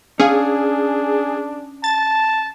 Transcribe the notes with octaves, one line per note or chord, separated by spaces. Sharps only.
C#4 D4 G#4 F5
A5 A6